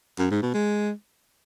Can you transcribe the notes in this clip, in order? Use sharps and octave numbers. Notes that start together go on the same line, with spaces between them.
F#2
G#2
B2
G#3